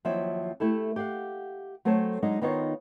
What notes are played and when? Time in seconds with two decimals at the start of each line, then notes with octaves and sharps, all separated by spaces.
0.05 D#2 F3 F#3 C4 E4 E5
0.60 A3 E4 G4 A4
0.96 G4 F5 F#5
1.85 F#3 A3 C4 A4 C#5 A5
2.22 F#3 G#3 D4 D#4
2.41 D#3 B3 D#4 F4 C5 C#5